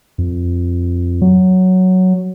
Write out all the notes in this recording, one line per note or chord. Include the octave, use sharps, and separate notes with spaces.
F2
F#3